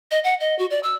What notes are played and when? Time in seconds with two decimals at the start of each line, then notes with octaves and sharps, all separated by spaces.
0.11 D#5
0.24 F#5
0.40 D#5
0.59 F#4
0.70 D5
0.83 E6